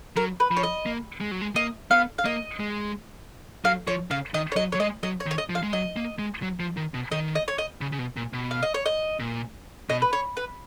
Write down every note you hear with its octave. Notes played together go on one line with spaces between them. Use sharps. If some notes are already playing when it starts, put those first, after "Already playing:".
F#3 A#4
B4
F3
C#5
D#5
A#3
G#3
F#3
G#3
A#3 D#5
B3 F5
F5
A#3 D#5
G#3
F#3 F5
F3 C#5
C#3 F5
D#3 D#5
C#5
F#3 D#5
C#5
F#3
G#3 D#5
F#3 D#5
C#5
D#3
C#5
D#5
F3
F5
G#3
F#3 D#5
A#3
G#3
F#3
F3
D#3
B2
D#3 D#5
D#5
C#5
D#5
C#3
C#3
B2
A#2
B2
F5
D#5
C#5
D#5
A#2
B2 D#5
B4
C#5
B4